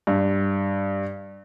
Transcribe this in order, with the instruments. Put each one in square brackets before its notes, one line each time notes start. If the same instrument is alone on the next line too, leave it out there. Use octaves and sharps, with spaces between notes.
[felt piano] G2